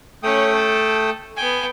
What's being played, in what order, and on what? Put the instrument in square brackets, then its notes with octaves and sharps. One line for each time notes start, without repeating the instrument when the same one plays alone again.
[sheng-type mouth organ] A3 G5 D#6 [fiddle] C#4 C#5
[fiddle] A4
[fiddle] B3 G5 [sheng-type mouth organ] G#5